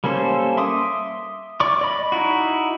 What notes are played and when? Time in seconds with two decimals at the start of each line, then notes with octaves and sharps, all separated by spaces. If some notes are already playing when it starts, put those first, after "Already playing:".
0.04 G3 A#3 C#4 A4 C5
0.57 E5 C6 D6 D#6
1.60 D5 C#6 D6
1.81 D5 D#5 B5
2.12 D#4 E4 F#4